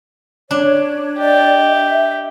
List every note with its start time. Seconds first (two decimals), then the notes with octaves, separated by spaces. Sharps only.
0.51 D4 C#5
1.19 G4 D5 D#5
1.69 E5